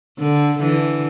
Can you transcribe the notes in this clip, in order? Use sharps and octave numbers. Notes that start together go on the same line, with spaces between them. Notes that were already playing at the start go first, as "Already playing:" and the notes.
D3
D3 E3